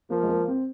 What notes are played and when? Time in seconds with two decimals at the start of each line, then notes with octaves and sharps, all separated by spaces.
0.10 F3 A#3
0.23 G#3
0.29 A#3
0.48 C4